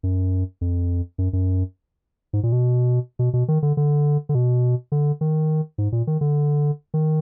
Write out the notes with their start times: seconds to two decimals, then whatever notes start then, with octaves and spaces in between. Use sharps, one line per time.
0.03 F#2
0.61 F2
1.18 F#2
1.33 F#2
2.33 G#2
2.43 A#2
2.52 B2
3.19 B2
3.33 B2
3.48 D#3
3.62 D3
3.77 D3
4.29 D3
4.35 B2
4.92 D3
5.21 D#3
5.78 G#2
5.92 A#2
6.07 D#3
6.21 D3
6.94 D#3